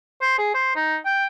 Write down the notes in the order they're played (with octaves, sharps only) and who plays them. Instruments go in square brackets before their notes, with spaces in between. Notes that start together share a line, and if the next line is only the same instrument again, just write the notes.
[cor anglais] C5
G#4
C5
D#4
G5